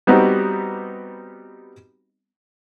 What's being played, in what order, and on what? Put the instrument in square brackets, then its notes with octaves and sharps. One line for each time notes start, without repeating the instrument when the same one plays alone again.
[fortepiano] G3 B3 C4 D#4 F#4 G4